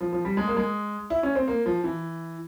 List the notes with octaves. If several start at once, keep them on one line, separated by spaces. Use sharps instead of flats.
F3
F3
G3
G#3
A#3
G#3
E4
C#4
C4
A#3
F3
E3